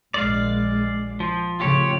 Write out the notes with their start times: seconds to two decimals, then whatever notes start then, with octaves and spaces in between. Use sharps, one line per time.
0.14 A#1 G#3 D5 F5
1.20 F3
1.60 A2 C#3 F3 F4 G4 C#5